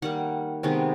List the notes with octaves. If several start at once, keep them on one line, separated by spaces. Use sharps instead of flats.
D#3 G3 A#3 F#5
C3 D#3 G#3 B3